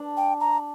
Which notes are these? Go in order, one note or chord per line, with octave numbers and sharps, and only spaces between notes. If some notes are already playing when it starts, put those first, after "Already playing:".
Already playing: D4
G5
A#5